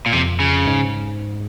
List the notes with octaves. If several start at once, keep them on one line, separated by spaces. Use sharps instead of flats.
A#2
F2 C3
C#3
G#2